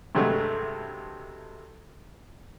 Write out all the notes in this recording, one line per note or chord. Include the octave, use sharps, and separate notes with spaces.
G2 C3 F#3 G#3 A3